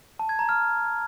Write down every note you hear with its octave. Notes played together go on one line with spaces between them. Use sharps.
A5
G#6
A#5
F6